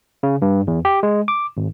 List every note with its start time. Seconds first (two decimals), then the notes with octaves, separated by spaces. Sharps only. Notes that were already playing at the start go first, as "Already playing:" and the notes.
0.23 C#3
0.42 G2
0.67 E2
0.85 G4
1.03 G#3
1.28 D6
1.57 G#1